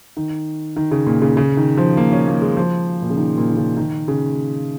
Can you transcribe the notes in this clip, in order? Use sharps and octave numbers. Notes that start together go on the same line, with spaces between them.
D#3
D#3
C#3
A#2
C#3
C#3
D#3
F3
A#3
C#4
A#3
G#3
F3
A#2
C#3
D#3
A#2
D#3
C#3
D#3
C#3